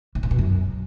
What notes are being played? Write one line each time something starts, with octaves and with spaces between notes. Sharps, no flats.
A2
A#2
B2
F#2